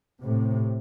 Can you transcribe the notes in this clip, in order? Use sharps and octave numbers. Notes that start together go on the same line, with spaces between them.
A2 C3